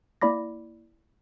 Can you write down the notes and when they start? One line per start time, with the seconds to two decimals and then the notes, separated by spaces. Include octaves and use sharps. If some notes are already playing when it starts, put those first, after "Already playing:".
0.22 A#3 E4 D5 B5 D6 A#6